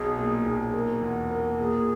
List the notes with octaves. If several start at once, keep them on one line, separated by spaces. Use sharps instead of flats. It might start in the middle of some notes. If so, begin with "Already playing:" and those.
Already playing: B1 G#4
A#2
B1
A#3
E2
A#3
A#2 G#4